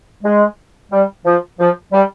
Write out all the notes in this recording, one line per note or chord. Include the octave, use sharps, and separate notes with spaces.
G#3
G3
F3
F3
G3